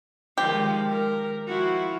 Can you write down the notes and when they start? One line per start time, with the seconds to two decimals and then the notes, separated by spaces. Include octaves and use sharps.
0.38 D#3 F3 G#3 G4
0.87 A#4
1.47 F3 E4 F#4